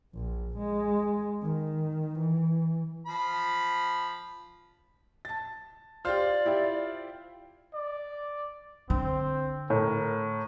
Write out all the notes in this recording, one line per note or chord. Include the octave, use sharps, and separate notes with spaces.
A#1
G#3
D#3
E3
F3 B5
A5 A6
F4 G4 C5 D5 F6
E4 G4 E5
D5
D3 C4
A2 A#4